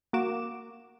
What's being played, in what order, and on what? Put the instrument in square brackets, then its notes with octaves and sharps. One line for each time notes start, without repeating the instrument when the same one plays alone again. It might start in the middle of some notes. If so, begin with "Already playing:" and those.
[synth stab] A#3 F#4 D6 E7